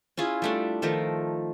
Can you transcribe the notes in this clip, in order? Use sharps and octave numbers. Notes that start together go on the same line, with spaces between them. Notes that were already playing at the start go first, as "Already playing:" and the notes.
C#4 E4 F4 G#4
G3 A3 D4
D#3 F3 A3 A#4